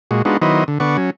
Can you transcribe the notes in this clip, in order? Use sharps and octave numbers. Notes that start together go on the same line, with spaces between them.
A#2 G#3 F#4
G#3 B3 D4 D#4 F4 F#4
D#3 F#3 B3 E4 C5 D#5
D3
D3 B3 D5 F#5 C#6
F#3 C#4